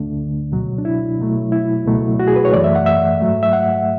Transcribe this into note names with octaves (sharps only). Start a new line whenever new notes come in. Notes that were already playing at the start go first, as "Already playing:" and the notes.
Already playing: D2 D3 A3 D4
C#2 B2 F#3
D4
E4
B2 F#3 A3
E4
C#2 B2 F#3 A3
F#4
G#4
B4
C#5
F#2 E3 A3 D5
E5
F#5
E5
G#2 F#3 A3
E5
F#5